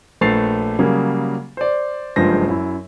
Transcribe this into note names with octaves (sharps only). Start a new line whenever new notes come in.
A#1 A3 B4 A6 C7 F7
C#3 F#3 G3 A#3 G#4
C5 D5
F#1 G2 F3 G#3 C5 A#6
F#2 E4